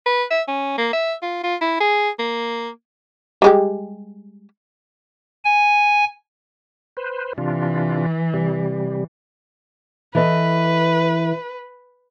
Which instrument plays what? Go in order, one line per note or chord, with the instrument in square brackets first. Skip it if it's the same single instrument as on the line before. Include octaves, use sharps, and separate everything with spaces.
[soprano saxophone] B4
E5
C#4
A#3
E5
F4
F4
E4
G#4
A#3
[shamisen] G3 G#3 G4
[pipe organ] G#5
[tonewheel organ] B4 C5
[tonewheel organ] C3 D4 F4 [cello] E3
[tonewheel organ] C3 G3
[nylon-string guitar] E3 A4 D#5 [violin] B4